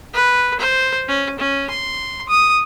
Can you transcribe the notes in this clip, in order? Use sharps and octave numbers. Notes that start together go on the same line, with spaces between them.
B4
C5
C#4
C#4
C6
D#6